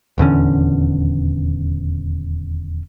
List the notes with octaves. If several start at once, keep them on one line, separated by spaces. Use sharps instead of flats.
D#1 E2 D3 C#4